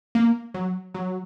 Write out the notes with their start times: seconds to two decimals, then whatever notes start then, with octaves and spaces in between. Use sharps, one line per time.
0.15 A#3
0.54 F#3
0.94 F#3